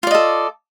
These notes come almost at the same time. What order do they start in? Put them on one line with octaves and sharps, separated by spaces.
F4 D5 D#5 A4